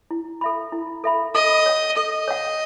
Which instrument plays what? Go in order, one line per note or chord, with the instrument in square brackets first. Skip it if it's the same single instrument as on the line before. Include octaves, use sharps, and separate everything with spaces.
[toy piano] E4
A4 E5 B5
E4
A4 E5 B5
[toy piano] A4 [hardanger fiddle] D#5
[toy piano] C#5 F#5
[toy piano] A4 [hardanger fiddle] D#5
[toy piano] C#5 F#5